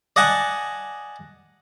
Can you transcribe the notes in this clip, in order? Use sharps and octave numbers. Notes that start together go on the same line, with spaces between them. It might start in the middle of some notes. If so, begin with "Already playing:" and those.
D5 D#5 F#5 G#5 A5